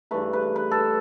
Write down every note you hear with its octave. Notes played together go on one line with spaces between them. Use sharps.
G2 E3 A3 B4
B4
B4
A4